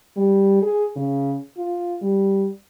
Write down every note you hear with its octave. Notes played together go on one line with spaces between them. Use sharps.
G3
G#4
C#3
F4
G3